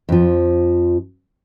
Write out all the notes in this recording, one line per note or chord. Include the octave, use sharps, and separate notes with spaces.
F2 F3